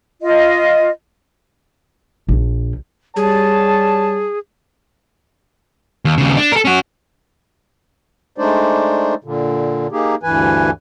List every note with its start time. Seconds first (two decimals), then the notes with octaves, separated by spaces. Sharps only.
0.22 F4 D#5
2.29 A#1
3.16 G3 G#4 C#5 A5
6.05 D#2
6.18 D#2 C#3
6.37 D4
6.52 A4 A#4
6.65 C#4 F#4
8.38 G#3 A3 D4 D#4 C5 D5
9.24 A#2 D3
9.92 A#3 D#4 G4 G#4
10.23 D2 G2 E3 B4 G#5